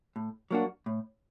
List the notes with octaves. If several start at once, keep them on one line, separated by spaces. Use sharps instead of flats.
A2
F#3 A#3 D4 F#4
A2